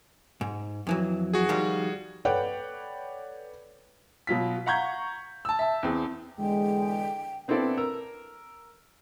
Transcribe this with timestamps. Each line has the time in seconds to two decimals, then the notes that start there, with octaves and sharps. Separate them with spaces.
0.41 G#2
0.87 F2 E3 F#3
1.34 F#4 G#4
1.49 D#3 F3 G3
2.25 A4 B4 C#5 D5 F#5 G5
4.27 B2 F#3 F4 B6
4.66 F5 F#5 A#5 C#6 G6 G#6
5.45 A5 E6
5.59 E5 A5
5.83 E2 C4 G#4
6.38 E2 D3 G#3 G5
7.48 B3 C4 D4 E4 A4 D5
7.77 A#4 A#5 E6